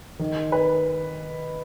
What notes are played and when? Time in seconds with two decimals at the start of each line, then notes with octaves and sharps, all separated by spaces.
0.19 D#3
0.52 B4